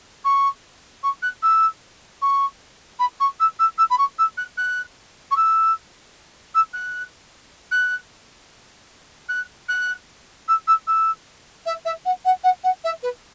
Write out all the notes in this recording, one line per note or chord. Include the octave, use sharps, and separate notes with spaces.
C#6
C#6
F#6
E6
C#6
B5
C#6
E6
E6
E6
B5
C#6
E6
F#6
F#6
C#6
E6
E6
F#6
F#6
F#6
F#6
E6
E6
E6
E5
E5
F#5
F#5
F#5
F#5
E5
B4